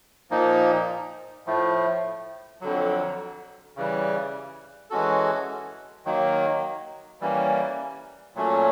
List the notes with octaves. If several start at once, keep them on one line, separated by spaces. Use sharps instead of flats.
A#2 F3 A#3 D#4
A2 F3 A3
F2 D3 F#3
C#3 E3 G3
E3 G#3 C#4 F#4 A4
D#3 F#3 A#3
E3 G3 A#3 C#4
A#2 F#3 A3 C#4